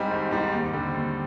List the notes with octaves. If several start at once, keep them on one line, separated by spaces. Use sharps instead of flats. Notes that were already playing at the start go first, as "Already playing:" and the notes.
Already playing: G#2 G3 C4 D#4
G#1
G#2 G3 C4 D#4
D#2
D3 G3 C4
D#2